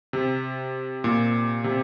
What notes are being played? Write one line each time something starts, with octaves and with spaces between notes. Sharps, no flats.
C3
A#2
C3